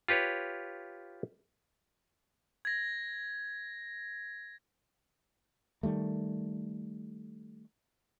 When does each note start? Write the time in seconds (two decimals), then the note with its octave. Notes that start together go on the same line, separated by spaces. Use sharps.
0.08 F4 G4 B4 C#5
2.65 G#6 A#6
5.83 D#3 G3 A3